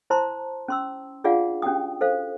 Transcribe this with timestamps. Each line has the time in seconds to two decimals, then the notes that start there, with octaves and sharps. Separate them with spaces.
0.10 E4 C5 A5 A#5 C6
0.68 C#4 C6 E6
1.24 D4 F4 G#4 D5 F5 F#5
1.62 C#4 D4 F#4 G4 G5 D#6
2.01 A4 C5 F5